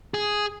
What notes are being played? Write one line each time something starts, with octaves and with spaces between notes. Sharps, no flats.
G#4